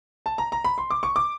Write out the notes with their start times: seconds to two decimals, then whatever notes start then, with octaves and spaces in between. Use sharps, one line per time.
0.26 A5
0.38 A#5
0.52 A#5
0.65 B5
0.78 C6
0.90 D6
1.03 C#6
1.16 D6